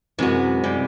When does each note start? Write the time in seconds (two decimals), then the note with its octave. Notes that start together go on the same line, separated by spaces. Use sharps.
0.18 F#2 C3 E3 G#3 F#4
0.64 C3 E3 G3